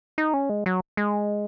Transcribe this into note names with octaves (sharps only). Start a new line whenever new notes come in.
D#4
C#4
G#3
F#3
G#3